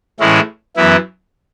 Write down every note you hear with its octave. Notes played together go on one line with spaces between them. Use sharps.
A2 E3 G#3 C#4 E4
F#2 E3 B3 E4